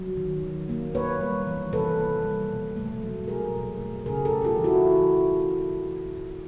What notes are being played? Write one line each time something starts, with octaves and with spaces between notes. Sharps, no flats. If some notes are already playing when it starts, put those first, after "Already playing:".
Already playing: F#3
D#3
D#3
A#3
A#3 B4 C#5
G3
E3
C3 A4 B4
A#3
G3
B2
A3
F#3
B2 G#4 A#4
B2
A3
C#3 G#4 A#4
G4 A4
A3
F4 G4
E3
E4 F#4